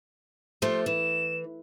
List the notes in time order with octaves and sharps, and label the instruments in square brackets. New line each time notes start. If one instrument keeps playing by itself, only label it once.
[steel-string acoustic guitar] F3 A3 G4 [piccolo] C6
[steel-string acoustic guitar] E3 [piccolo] E7